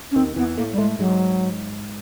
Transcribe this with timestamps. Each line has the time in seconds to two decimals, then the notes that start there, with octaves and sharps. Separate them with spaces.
0.12 C#4
0.16 D#2 D#3 C4
0.36 E2 E3 B3
0.57 A2 A3 A#3
0.72 G3
0.78 A2 G#3 A3
0.99 G#2 F#3 G#3